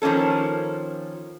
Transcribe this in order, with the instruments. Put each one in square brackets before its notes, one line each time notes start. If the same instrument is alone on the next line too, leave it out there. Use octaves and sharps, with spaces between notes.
[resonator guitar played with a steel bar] D#3 F3 A#3 C#4 A4